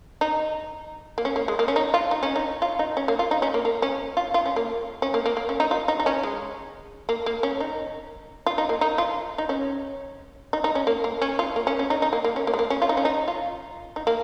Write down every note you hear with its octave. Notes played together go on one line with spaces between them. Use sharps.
D#4
A#3
C#4
A#3
G#3
A#3
C#4
D#4
F4
D#4
C#4
D#4
F4
D#4
C#4
A#3
F4
D#4
C#4
A#3
A#3
C#4
F4
F4
C#4
A#3
C#4
A#3
A#3
A#3
C#4
D#4
F4
D#4
D#4
C#4
G#3
A#3
A#3
C#4
D#4
F4
D#4
A#3
D#4
F4
D#4
C#4
D#4
D#4
C#4
A#3
A#3
C#4
F4
A#3
C#4
C#4
D#4
D#4
A#3
A#3
C#4
A#3
G#3
A#3
C#4
F4
D#4
C#4
D#4
F4
D#4
A#3